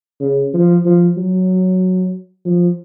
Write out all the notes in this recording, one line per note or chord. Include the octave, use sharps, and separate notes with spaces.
C#3
F3
F3
F#3
F3